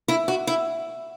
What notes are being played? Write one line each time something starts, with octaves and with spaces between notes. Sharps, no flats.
E4
F#4
E4